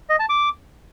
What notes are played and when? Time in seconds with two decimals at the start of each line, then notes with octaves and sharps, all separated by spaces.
0.09 D#5
0.19 A5
0.29 D6